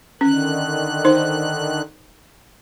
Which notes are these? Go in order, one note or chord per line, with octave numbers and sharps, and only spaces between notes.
D3 D#3 C#4 F#6
D#4 C5